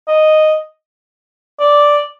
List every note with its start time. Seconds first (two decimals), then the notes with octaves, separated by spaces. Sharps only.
0.08 D#5
1.60 D5